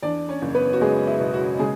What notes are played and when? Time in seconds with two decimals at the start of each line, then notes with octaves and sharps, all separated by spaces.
0.03 E2 D4 D5
0.29 C#4 C#5
0.42 F#1
0.55 B3 B4
0.73 F#4
0.81 F#1 G#3 G#4
1.07 E4
1.20 B2
1.34 F#4
1.59 C#3 G#3 G#4